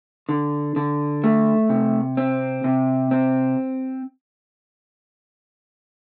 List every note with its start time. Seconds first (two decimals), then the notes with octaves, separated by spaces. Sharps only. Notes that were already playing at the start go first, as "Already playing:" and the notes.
0.29 D3
0.76 D3
1.24 A3
1.69 C3
2.17 C4
2.64 C3
3.11 C4